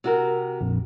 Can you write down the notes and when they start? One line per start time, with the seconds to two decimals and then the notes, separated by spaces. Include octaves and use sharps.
0.04 C3 F#4 A#4
0.61 A#1 F2